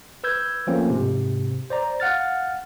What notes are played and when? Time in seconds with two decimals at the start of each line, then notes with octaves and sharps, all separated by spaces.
0.24 B4 E6 G6 G#6
0.67 F3 A3 A#3 C4 C#4 F4
0.90 G#2 C3
1.70 C5 D5 A#5
2.00 F5 F#5 F6 A6